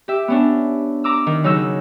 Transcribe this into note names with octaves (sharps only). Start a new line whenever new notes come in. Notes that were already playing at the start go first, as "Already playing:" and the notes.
G4 E5
B3 C#4 D4
A#5 D6 E6
D#3
C#3 F#3 D#4 G#4 E6 G6